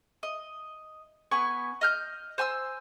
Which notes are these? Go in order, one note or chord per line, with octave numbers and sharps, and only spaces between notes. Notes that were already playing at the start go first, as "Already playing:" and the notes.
D#5
B3 B4 G#5 C#6
D#5 F6 G6
C5 G#5 C6 E6